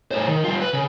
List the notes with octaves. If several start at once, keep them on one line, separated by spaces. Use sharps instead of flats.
A2 C5
D#3
G3 F4
B4
C#3